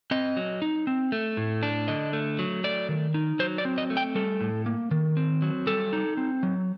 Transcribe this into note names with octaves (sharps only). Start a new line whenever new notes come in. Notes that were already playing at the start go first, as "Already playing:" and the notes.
C4 D#5
F#3
D#4
C4
A3
A2
D4
D3 D#5
A3
F#3
A3 D5
D#3
D#4
F#3 C5
D5
C4
D#5
A3
G5
G3 A4
A2
A#3
D#3
C4
F#3
G3 A4
D#4
C4
F#3